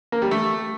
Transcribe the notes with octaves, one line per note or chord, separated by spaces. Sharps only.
A#3
G3
A3